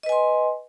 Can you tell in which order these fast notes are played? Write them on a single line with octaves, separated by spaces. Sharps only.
D#5 B4 G#5 C6